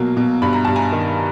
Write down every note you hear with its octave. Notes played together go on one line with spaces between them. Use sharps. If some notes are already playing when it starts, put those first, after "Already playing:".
Already playing: B2 F#3 A#3
B2
G2 B5
A#5
G2 A5
G#5 A#5
D#3